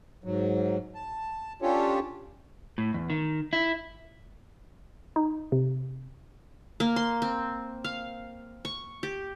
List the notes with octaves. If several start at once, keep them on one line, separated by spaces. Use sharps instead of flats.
G#2 F#3
A5
C#4 D4 F4 G4 A4 C#5
A2
E2
D#3
E4
D#4
C3
A#3
C6
C4
F5
C#6
G4